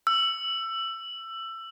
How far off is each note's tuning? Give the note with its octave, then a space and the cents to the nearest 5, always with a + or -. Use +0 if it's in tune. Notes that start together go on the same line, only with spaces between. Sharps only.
E6 +20